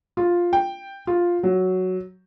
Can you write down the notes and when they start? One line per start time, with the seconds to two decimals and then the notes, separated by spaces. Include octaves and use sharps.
0.17 F4
0.53 G5
1.07 F4
1.43 F#3